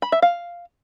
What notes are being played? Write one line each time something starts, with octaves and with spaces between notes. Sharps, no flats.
B5
E5
F5